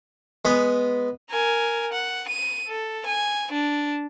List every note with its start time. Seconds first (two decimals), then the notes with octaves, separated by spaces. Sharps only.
0.45 G#3 B3
1.30 A#4 G#5
1.92 F#5
2.28 D#7
2.67 A4
3.06 G#5
3.52 D4